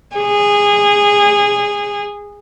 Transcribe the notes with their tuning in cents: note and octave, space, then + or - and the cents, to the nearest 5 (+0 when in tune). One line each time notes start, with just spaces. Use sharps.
G#4 -20